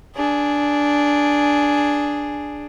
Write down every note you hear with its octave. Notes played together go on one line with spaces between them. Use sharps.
D4 G#4